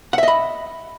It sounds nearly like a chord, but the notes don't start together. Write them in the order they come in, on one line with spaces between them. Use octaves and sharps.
F#5 E5 D#5 B5